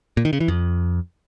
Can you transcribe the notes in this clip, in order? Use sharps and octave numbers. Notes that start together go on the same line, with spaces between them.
A#2
D#3
C#3
E3
F2